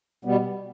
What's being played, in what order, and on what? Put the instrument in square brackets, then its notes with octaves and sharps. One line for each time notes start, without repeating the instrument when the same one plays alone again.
[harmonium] B2 G3 B3